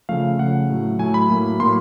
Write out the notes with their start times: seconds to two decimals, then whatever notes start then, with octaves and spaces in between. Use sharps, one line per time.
0.09 C#3 F3 A3 F5
0.39 C#3 F3 A3 F#5
0.69 A2 F#3 A3
0.99 A2 F#3 A3 G#5
1.14 B5
1.30 A2 F#3 A#3
1.60 A2 F#3 A#3 C6